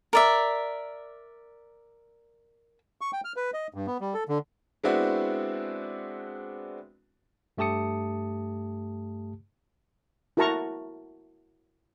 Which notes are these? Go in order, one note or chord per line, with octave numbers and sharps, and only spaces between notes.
A#4 D5 E5
C#6
G5
F6
B4
D#5
G2
B3
G3
A4
D3
G#3 B3 C4 D4 E4 F#4
G2 A3 G4 A5 D#6 C#7
E4 F#4 A#4 A5 A#5 C#6